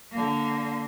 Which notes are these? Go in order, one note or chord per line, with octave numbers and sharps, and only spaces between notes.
D3 A#3